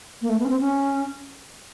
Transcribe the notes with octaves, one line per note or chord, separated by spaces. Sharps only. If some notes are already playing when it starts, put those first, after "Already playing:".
A#3
A3
B3
C#4
C4
C#4